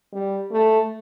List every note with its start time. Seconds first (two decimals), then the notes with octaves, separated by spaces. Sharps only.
0.13 G3
0.52 A3